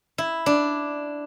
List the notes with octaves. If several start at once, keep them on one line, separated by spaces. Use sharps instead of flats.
E4
D4